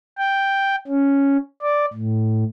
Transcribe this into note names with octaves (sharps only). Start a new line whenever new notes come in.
G5
C#4
D5
A2